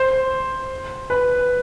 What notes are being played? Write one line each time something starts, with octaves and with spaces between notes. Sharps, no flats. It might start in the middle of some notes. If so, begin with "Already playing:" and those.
Already playing: C5
B4